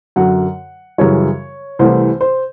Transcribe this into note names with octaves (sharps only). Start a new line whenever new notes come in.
F#2 D3 F#3 F#5
F#2 C#3 E3 G3 C#5
C2 C3 E3 A3 C5
C5